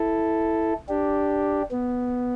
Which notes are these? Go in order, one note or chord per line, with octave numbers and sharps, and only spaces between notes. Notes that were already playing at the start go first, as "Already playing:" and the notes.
Already playing: E4 A4
D4 G4
B3